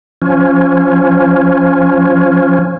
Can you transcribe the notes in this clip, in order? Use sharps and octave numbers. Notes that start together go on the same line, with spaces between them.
F3 C#4